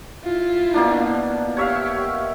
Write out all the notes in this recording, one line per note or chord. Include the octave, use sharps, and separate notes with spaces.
E4 F4
B2 A#3 D4
G4 C#5 E5 F5